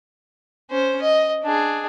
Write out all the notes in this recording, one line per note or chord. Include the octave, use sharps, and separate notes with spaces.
C#4 C5
D#5
D4 G#4